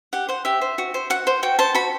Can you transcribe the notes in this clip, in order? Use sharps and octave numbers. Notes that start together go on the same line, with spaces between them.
G4 F#5
C5 F#5
G4 E5
C5
F#4
C5
F#4 F#5
C5
F#4 G5
C5 A5
F#4 B5